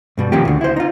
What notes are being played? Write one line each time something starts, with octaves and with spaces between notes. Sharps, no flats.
G2 B2 G3
D#3 F3 A#3 C#4 G4
D2 D3
E4 C5
D#4 F4